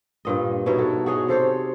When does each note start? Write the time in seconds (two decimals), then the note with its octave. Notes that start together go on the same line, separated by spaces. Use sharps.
0.25 G2 A#2 D#5
0.66 B2 D#4 E4 C#5
0.78 F#4 A4
1.06 F#4 G#4 C#5 D#5
1.28 C3 A4 C5 C#5